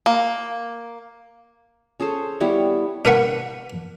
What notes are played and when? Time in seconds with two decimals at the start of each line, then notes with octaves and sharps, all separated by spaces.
0.06 A#3
2.00 C#4 G#4 A4 C5
2.40 G3 B3 E4 C#5
3.05 D4 A#4 B4 F#5 C#6